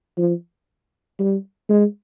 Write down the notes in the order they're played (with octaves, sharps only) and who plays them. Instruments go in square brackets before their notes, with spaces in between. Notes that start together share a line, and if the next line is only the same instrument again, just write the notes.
[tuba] F3
G3
G#3